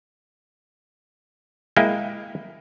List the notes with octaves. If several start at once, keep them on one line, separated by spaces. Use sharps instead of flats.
G#3 A#3 E4 F5 G5 G#5